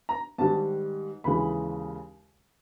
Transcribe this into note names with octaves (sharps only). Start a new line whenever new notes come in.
A#5
G#2 D#3 G3 A5
D#2 C#3 E3 G#3 B5